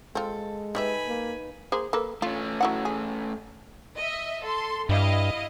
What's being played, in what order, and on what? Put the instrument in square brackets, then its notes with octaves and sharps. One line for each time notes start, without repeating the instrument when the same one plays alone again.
[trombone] G#3 [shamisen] C4 F4 [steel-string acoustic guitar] A4
[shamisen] G3 C#5 E5 [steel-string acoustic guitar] D#4 B4 [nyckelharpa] G#5 B5
[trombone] A#3
[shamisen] A#3 G#4 C5
A#3 A4 B4
[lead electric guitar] A3 C#4 [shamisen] F4
[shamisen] F#3 E4 F#5
G#4
[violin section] D#5 E5
A4 C6
[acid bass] G2 [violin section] E4 D#5 F5